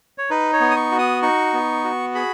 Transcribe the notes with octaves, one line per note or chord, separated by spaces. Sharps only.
C#5
D#4 B4
C#5
B3
D#6
C#6
F#4
D#6
D#4 C#6
B3
F#4
G#4 B5